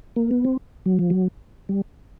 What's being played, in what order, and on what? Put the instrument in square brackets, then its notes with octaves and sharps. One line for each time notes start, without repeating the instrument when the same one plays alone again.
[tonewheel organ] A#3
B3
C4
F#3
F3
F#3
G3